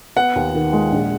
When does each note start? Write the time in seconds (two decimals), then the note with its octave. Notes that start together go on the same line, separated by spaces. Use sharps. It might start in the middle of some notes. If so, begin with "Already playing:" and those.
0.16 B3 F#5
0.36 D#2
0.54 D#3
0.73 G#3
0.92 A#1